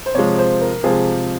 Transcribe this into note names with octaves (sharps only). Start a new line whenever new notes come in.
C5
C3 F3 G#3 C#5
C5
A#4
C3 F3 G#3 G#4